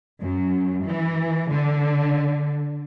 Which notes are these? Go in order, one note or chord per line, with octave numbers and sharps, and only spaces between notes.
F#2
E3
D3